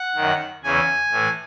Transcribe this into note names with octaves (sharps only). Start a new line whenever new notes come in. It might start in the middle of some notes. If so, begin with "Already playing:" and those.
Already playing: F#5
F#2 D#3
E2 C#3 E3 G#5
A2 E3